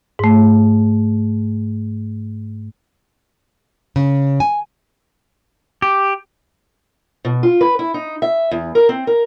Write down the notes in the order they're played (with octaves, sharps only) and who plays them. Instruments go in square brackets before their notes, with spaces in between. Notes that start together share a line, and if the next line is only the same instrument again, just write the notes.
[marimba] G#2 A3
[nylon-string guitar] C#3
G#5
[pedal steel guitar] G4
[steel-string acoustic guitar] B2
F4
B4
E4
D#4
E5
E2
A#4
C4
A#4